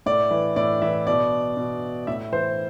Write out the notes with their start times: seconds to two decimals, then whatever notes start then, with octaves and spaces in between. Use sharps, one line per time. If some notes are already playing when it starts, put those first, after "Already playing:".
0.06 A2 D5
0.31 E3
0.56 A2 D5
0.82 E3 E5
1.07 B2 D5
1.57 B2
2.07 A2 E5
2.32 E3 C5